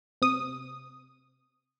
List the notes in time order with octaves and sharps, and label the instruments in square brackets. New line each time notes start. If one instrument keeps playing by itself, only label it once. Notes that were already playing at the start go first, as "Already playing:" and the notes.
[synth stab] C3 D#6